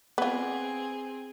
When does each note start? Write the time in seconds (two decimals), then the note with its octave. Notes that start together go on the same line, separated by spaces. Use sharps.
0.18 B3 C4 F4 G#4